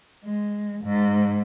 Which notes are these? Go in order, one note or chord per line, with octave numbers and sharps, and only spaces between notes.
G#3
G#2